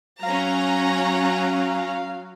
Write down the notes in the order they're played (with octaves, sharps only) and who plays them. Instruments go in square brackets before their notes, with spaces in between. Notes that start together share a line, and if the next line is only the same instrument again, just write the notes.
[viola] F#3 [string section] C#4 A#5 [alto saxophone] F5